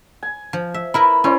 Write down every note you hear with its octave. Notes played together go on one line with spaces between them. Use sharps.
G#5
F3
E5
E4 A#4 B4 B5
C#4 E4 C5 D5